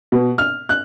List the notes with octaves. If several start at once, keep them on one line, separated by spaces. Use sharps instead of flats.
B2
F6
F#6